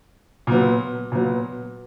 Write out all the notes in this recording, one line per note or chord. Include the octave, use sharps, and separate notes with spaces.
A#2 F#3 B3
A#2 F#3 B3